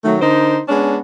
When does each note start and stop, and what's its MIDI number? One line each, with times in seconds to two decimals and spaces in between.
0.05 0.16 51
0.05 0.16 54
0.05 0.16 57
0.21 0.60 50
0.21 0.60 63
0.21 0.60 70
0.21 0.60 72
0.69 0.98 56
0.69 0.98 59
0.69 0.98 61
0.69 0.98 62